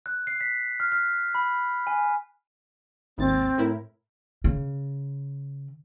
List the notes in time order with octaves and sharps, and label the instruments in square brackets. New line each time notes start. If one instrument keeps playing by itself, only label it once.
[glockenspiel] F#6
C7
B6
F6
F6
B5
G#5
[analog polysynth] G#1 D#2 A6 [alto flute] C4
[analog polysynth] A2 E4 A#4
[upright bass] C#3